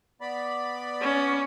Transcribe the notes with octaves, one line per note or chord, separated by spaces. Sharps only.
B3 D5 B5
C#4